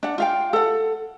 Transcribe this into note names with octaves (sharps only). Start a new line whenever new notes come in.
D4 F#5
F4 F5 G5
A4 F#5